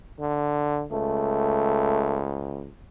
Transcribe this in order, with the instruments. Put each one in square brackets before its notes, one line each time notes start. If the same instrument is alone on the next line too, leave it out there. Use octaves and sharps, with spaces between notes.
[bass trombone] D3
[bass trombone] C#2 [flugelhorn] A3